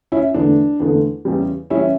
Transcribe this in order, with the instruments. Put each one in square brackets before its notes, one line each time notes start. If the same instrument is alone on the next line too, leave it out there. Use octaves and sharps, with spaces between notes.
[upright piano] C#4 E4
E2 D3 A3 D4
E2 D3 A3
E2 C#3 E3 G3
C#3 E3 G3 C#4 E4